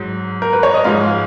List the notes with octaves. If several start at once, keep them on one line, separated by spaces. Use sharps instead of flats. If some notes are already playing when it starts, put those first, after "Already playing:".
Already playing: G#2 F#3
A#4
B4
C#5
D#5
G#2 F3 G#3 F5